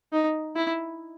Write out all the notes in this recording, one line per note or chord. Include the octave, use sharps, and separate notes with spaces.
D#4
E4